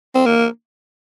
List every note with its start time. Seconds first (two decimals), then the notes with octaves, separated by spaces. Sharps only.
0.15 C4
0.26 A#3